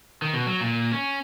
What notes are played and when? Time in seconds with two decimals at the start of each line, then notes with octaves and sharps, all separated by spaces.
0.22 D#3
0.33 B2
0.47 F#3
0.61 A#2
0.92 C#4